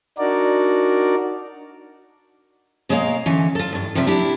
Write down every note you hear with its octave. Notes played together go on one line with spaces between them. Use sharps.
D4 D#4 F#4 A#4 D5
B2 G#3 A#3 C#5 D5 F5
D3 E3 C#4
F4 A4
D2 G2
C3 F3 F4 D5 E5
D4 E4 G4